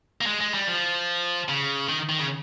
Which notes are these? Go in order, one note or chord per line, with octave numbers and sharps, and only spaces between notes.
A#3
G#3
G#3
G3
F3
C#3
D#3
D#3
C#3